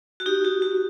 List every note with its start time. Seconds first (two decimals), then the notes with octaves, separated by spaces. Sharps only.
0.20 F#4
0.26 D#4 G4
0.44 F#4
0.62 F#4